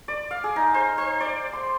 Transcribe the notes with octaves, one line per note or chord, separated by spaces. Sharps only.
D5
F5
G#4
D#4
C5
C5
D5
C6